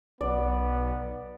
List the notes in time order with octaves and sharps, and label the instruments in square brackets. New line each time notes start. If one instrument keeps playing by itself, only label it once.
[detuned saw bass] B1 [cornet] B3 [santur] D5